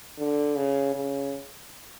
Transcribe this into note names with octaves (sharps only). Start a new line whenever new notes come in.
D3
C#3
C#3